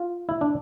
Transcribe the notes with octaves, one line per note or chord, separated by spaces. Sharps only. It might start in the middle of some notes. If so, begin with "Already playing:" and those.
Already playing: F4
E4
D4